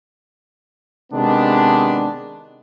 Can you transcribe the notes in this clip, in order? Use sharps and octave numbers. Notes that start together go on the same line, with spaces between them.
C3 D#3 G#3 B3 D4